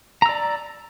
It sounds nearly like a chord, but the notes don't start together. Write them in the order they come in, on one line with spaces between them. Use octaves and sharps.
A#5 E6 D5